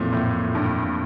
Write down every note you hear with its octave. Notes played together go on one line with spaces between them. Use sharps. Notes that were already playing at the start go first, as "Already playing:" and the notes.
Already playing: F2 A#2 E3 A3 C4
A2
G2